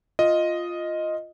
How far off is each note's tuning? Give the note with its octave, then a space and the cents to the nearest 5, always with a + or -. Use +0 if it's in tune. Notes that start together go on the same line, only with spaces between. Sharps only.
F4 +0 D#5 +0